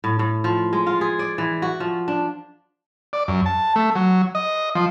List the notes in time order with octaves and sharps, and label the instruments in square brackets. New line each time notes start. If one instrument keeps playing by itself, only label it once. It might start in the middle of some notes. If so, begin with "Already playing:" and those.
[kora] A2
A2
F3
G#3
F4
G#4
D5
E3
F#4
F3
D4
[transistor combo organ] D5
F#2
A5
A3
F#3
D#5
F3